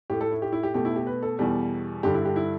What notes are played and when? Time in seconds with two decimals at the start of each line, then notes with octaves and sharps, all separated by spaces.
0.10 A2 A3 G4
0.21 A4
0.31 E4
0.42 G4
0.52 E4
0.63 G4
0.74 B2 A3 G4
0.85 E4
0.96 G4
1.07 B4
1.23 A4
1.39 E2 B2 G3
2.03 G2 D3 G3 G4
2.14 E4
2.25 G4
2.36 E4